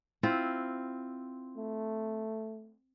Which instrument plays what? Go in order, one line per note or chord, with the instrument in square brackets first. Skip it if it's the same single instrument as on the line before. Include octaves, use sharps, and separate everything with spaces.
[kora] C4 E4 F4
[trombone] A3